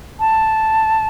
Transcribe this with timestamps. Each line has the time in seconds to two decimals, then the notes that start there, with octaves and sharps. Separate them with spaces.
0.19 A5